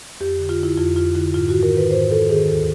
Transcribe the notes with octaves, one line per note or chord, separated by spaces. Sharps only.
F2 G4
D3
F4
D3 E4
F2 F4
F2 F4
D3 E4
G#2 F4
D#3 F#4
A#4
D#3
B4
G#2 C5
G#2 A4
D#3 G#4
D#2 A4